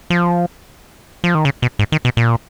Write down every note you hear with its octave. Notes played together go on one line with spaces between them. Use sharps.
F3
F3
D#3
C#3
B2
G#2
D#3
B2
A#2